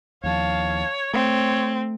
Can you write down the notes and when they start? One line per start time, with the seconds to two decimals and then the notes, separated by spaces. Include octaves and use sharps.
0.23 D#2 F3 C#5 F5 A5
1.13 A3 C4 C#5